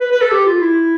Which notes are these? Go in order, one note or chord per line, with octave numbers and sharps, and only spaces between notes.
B4
B4
A4
G4
F4
E4